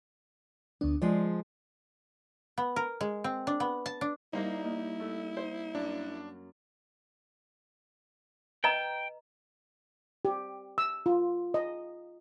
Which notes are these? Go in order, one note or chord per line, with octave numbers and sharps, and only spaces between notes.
D2 B3 D4
F3 G#3 G#4 D5
B3
A#4
G#3
C4
D4
B3
A5
D4
G3 A#3 D#4 E4 C5
A#3 D#5
A3
C5
F#2 A#3 D4
B4 D#5 G5 A#5
G4
E6
F4
D#5